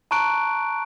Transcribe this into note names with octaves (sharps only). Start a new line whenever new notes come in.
A5 A#5 C#6 F#6 D7